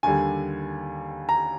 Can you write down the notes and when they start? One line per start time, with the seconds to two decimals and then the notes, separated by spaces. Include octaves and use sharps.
0.03 D#2 D3 G3 G#5
1.29 A#5